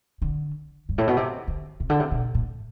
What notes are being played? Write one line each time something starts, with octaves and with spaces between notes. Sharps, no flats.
D3
G2
A2
B2
C3
D3
C3
D3
C3
B2
A2